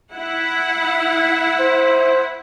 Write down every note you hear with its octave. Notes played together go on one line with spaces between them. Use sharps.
E4 F#5
C5